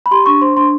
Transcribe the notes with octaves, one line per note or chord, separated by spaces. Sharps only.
B5
G4 C6
D4 C#6
C5 C6
D4 C6